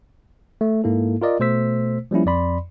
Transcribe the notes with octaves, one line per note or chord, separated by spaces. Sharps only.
A3
G#2 A#3 E4 A4
F4 A#4 D5 D#5
B2 A3 C5 E6 B6
F3 G3 A#3 C#4 E4
F2 D5 B5 C6